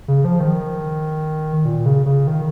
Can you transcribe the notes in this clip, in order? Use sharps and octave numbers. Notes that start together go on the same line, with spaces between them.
C#3
F3
D#3
A#2
C#3
C#3
D#3